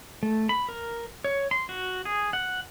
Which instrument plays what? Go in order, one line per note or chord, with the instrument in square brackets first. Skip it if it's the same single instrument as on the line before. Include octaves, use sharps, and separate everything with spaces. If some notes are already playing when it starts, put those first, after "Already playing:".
[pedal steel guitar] A3
B5
A#4
C#5
C6
F#4
G#4
F#5